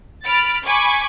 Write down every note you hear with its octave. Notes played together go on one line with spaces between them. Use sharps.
B5 F6 A6 D7
G#5 B5 C#6 D6